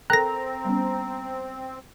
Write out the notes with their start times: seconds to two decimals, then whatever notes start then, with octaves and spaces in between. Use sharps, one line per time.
0.10 C4 A4 A#4 G5 A#5 F#6 A#6
0.65 G3 B3 C#4